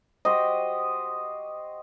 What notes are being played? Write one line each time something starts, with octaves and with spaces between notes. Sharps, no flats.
F#4 G4 C5 D#5